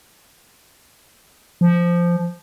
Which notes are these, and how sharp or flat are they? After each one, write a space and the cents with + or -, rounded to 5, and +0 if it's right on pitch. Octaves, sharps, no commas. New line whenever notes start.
F3 -10